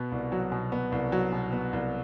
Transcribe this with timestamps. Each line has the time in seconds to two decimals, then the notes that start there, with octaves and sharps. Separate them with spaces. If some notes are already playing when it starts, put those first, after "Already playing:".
Already playing: B2 B3
0.12 C2
0.32 F#3
0.52 B2
0.72 B3
0.92 C2
1.12 F#3
1.33 B2
1.53 B3
1.73 C2